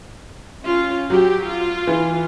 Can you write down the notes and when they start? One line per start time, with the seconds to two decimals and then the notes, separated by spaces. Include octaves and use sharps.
0.62 C#4 F4
1.10 F#3 G4
1.46 F4
1.87 E3